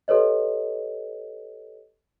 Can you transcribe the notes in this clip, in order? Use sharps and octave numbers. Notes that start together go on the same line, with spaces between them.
G4 A4 B4 C#5 D#5